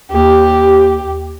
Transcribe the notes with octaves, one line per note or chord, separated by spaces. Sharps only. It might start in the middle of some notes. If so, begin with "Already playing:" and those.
D#2 G4